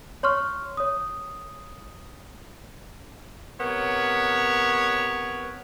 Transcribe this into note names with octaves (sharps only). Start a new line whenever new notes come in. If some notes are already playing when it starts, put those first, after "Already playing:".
C#5 C6 C#6 F6
C#5 D#6
C3 B3 A#4 C#5